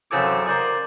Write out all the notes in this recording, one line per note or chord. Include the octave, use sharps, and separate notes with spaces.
F#2 C#3 C4 A4 G#5 D6
A#4 C5 D5 G#5